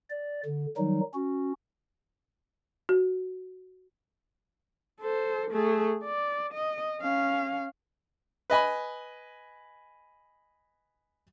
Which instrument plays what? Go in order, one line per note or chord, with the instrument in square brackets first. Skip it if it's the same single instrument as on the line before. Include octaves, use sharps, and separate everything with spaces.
[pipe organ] D5
D3
D#3 F#3 G3 D#4
C#4 F#4
[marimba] F#4
[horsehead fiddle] A4 C5
A3 G#4
D5
D#5
C#4 F5
[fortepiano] B4 D#5 G#5 B5